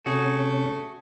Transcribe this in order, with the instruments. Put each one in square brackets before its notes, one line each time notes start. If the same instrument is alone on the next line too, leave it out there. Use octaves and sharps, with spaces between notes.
[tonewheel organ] C3 C#4 [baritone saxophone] A3 [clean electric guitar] F#4 G#4